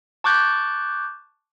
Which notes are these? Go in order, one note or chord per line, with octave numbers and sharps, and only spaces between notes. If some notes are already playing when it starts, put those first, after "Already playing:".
A5 C#6 D6 F#6 G6 A6